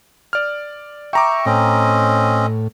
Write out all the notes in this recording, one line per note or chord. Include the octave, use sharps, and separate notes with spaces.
D5 F6
E5 G5 A#5 C#6 D6
A2 C4 C#4 D#5